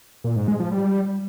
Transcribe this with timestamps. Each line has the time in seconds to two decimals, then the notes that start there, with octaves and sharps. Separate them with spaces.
0.24 A#2
0.36 G#2
0.48 G#3
0.60 F3
0.72 G3